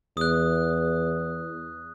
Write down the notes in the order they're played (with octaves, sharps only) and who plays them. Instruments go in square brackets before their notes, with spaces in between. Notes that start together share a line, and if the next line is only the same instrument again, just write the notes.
[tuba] E2 [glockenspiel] D#6 F#6